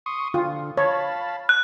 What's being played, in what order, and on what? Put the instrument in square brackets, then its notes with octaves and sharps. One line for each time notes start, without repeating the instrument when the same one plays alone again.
[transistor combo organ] C6 C#6 D#6
[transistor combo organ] D3 [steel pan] F4
[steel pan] C#5 [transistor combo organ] F5 A5 B5
[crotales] F#6